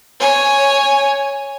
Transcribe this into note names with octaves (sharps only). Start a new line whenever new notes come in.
C#5 G#5